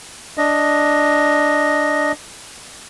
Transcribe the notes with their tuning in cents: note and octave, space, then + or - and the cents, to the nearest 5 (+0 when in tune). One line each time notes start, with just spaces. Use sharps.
D4 +0 D#5 +0